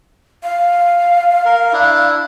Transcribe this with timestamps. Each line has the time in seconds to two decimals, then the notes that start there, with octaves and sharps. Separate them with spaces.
0.43 F5
1.45 A#4
1.73 D4 E4